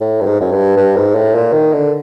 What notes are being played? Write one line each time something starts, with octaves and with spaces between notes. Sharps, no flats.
A2
G2
G#2
F#2
G2
G2
G#2
A2
A#2
D#3
D3